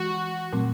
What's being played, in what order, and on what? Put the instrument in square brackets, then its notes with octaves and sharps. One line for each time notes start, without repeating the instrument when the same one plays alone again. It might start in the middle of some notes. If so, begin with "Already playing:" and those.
Already playing: [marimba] E3 G#3 [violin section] F#4
[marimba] A#2 F#3 A3 C4